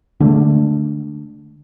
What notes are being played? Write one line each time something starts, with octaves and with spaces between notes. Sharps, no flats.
D3 G#3 A3 D4